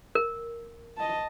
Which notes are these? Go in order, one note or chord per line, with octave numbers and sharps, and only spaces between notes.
A#4
D#5 A5